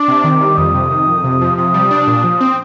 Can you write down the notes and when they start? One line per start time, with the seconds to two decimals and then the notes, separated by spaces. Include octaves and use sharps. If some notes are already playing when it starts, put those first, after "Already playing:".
Already playing: D4 D6
0.08 C3
0.24 D#3
0.41 G3
0.57 F2 D#6
0.75 C3
0.91 D#3
1.07 F2
1.24 C3
1.41 F3
1.58 C3 D#6
1.74 G3
1.91 D4
2.08 A#2
2.24 F3
2.41 C4